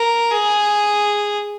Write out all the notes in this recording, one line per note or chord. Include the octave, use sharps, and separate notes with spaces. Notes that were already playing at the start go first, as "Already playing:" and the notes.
Already playing: A#4
G#4